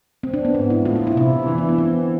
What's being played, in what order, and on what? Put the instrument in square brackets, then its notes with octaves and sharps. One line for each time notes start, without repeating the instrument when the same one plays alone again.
[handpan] C4
D4
B3
[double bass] G#2 [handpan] D4
[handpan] E4
[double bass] A2 [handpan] F4
[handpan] E4
E4
[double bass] C3 [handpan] E4
[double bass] E3 [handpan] D4
[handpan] B3
B3
C4